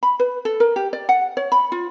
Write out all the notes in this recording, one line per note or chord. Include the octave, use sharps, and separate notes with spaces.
B5
B4
A4
A#4
G4
D5
F#5
C#5
B5
F4